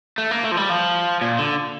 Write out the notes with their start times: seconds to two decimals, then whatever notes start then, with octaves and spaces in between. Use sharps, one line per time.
0.18 A3
0.31 A#3
0.44 A3
0.52 F3
0.57 G3
0.70 F3
1.21 A#2
1.39 D3